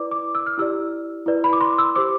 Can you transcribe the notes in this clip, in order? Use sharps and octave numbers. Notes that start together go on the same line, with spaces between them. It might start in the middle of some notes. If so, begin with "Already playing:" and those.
Already playing: E4 B4 D5 D6
D6
E6
F6
E4 G4 D5 E6
E4 B4 D5
B5
D6
C6
E6
G4 C5 D6